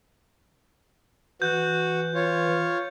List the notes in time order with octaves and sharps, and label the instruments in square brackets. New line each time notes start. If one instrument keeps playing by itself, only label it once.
[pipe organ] E3 [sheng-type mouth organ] F#4 [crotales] G6
[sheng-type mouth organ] F4 C#5